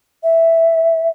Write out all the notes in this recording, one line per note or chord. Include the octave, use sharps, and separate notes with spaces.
E5